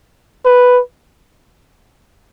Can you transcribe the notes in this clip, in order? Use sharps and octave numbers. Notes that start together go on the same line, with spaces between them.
B4